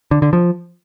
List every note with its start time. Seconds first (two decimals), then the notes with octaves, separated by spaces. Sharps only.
0.11 D3
0.22 D3
0.33 F3